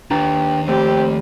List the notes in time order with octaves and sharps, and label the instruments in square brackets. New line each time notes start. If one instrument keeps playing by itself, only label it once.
[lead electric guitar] D#2 [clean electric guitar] D4 B4 A#5 [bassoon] G4
[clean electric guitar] F3 A3 [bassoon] C4 [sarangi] G4